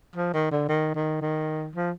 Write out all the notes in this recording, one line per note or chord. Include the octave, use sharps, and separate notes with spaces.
F3
D#3
D3
D#3
D#3
D#3
F3